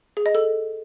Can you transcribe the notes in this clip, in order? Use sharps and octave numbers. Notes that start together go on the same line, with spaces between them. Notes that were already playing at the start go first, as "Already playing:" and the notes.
G#4
D#5
A4